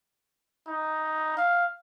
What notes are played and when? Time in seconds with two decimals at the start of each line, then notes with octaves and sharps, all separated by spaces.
0.68 D#4
1.37 F5